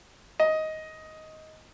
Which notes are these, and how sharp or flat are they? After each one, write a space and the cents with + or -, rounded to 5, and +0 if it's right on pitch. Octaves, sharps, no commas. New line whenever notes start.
D#5 +10